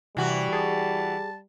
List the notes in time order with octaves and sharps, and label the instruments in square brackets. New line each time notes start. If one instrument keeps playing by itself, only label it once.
[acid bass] C3 [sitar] E3 F#4 [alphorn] G3
[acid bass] G#4 [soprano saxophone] A5